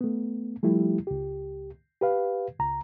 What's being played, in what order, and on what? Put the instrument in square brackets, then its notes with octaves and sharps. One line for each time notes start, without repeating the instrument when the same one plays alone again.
[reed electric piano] A3 B3
F3 G3 A3 E4 G4
C#2 G4
G4 B4 F5
C#2 A#5